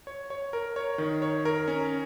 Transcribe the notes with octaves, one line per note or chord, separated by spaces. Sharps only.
C#5
C#5
A#4
C#5
D#3
C#5
A#4
C#4